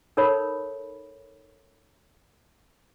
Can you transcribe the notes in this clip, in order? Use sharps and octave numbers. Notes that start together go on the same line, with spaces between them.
D#4 A4 A#4 C#5 B5